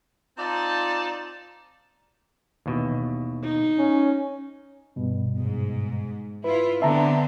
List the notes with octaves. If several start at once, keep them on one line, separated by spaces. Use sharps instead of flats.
C4 D#4 F4 D5 A5
D#2 B2 E3
D#4
C#4
G2 B2
G#2
E4 F4 B4
D3 B3 C4 E5 A5 A#5